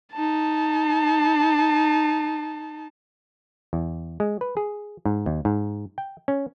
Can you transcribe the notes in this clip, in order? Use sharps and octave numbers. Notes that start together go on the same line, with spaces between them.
D#4 A5
E2
G#3
B4
G#4
G#2
D#2
G#2
G5
C#4